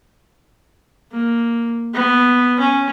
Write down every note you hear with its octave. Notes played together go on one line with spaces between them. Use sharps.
A#3
B3
C#4